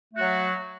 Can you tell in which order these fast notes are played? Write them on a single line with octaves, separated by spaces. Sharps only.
A3 F#4 F#3